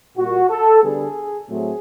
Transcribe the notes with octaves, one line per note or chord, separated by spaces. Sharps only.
A#2 G3 A#3 F#4
A4
D3 G3 B3 G#4
A2 F#3 A3 C4 G#4